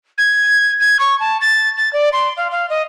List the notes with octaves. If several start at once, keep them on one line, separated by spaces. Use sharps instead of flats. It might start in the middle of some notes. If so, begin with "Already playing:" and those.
G#6
G#6
C#6
A5
A6
A6
D5
C6
F5
F5
D#5